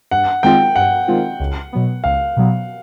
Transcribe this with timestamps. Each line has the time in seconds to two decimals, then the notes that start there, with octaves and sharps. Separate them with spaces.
0.11 G2 F#5
0.43 D#3 G#3 C4 F4 G5
0.76 G2 F#5
1.08 D#3 G#3 C4 F4
1.40 C#2
1.73 B2 F#3 B3
2.04 C#2 F5
2.37 B2 F#3 B3